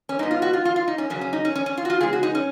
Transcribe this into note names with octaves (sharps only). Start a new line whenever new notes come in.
C#4
G#2 F#3 B3 D#4
F4
F#4
F4
F4
F4
D#4
C#4
F#2 C#3 F#3 C#4
C#4
D#4
C#4
C#4
C#4
F4
F#4
F4
C#3 G#3 B3 G#4
F#4
D#4
C#4